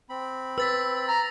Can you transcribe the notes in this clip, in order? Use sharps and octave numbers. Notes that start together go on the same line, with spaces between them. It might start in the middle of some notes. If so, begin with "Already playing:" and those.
C4 B5
B4 E6 A6 B6
A#5 A#6